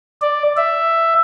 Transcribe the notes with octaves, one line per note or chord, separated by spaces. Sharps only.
D5
E5